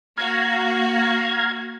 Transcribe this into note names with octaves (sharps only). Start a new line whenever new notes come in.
A#3 F#4 F5 A#5 G#6